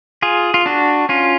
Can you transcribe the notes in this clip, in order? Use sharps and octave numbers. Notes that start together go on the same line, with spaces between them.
F4 G#4
F4
D4 F#4
C#4 F4